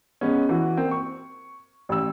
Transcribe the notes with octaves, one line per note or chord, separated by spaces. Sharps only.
G#3 B3 C#4
E3 F#4
A#3 C4
C#6
A1 E6